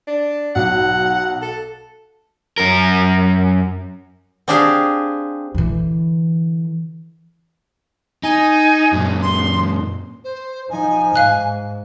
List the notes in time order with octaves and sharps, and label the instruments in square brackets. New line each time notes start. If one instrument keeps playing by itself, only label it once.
[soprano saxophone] D4
[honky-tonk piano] B1 [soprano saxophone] F#5
[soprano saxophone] A4
[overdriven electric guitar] F#2 A#4
[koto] C4 D4 G4 G#4 F5
[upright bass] D3 E3
[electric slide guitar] D#4 [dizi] G#5
[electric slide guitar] F#2 A#2
[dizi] C6
C5
[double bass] F3 D#4 [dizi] G#5
[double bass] G#2 [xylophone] F5 F#6